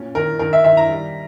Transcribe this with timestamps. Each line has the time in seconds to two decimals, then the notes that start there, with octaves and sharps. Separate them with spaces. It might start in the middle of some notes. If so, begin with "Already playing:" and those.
Already playing: A#2 C#4
0.15 D#3 A#4
0.39 D#3 A#4
0.53 E5
0.64 D#3 E5
0.77 A#5
0.89 G3